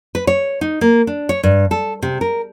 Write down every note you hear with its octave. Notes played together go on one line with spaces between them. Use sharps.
B4
C#5
D#4
A#3
D4
C#5
G2
A4
C3
A#4